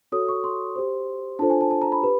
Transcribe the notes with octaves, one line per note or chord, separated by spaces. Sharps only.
F#4 A4 C#5 D#6
C#6
C6
G4 C5
D4 F4 A4 C5 A5
G#5
A5
A5
A#5
B5
G4 B4